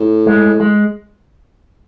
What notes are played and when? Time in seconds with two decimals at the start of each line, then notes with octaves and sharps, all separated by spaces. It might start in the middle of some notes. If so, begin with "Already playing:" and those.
Already playing: A2
0.26 G#3
0.60 G#3